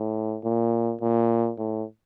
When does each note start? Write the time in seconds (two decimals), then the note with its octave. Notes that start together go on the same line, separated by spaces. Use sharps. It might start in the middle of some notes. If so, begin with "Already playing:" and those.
Already playing: A2
0.44 A#2
1.01 A#2
1.58 A2